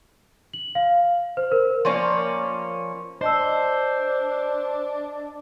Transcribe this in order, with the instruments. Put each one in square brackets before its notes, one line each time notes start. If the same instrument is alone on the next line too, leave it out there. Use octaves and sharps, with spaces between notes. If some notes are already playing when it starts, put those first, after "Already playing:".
[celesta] F#7
F5
C5
A#4
[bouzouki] F3 A#3 C#4 D5
[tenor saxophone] D4 [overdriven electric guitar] C5 [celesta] D#5 A5 E6